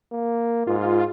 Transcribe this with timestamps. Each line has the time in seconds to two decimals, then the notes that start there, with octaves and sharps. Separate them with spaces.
0.12 A#3
0.67 G#2 F4